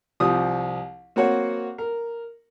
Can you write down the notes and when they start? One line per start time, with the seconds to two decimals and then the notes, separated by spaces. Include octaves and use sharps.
0.20 C2 F3 G4 D#6
1.16 A#3 C4 F#4 C#5 F#5
1.78 A#4